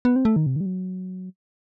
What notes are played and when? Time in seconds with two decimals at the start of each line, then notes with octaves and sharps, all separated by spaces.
0.05 B3
0.16 C4
0.25 A3
0.36 D#3
0.46 C3
0.56 D#3
0.61 G3
0.66 F#3